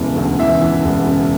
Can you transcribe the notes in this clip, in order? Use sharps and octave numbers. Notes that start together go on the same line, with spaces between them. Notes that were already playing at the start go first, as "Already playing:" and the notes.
Already playing: E1 C#3 E3
D2
E3 E5
E3
E1
C#3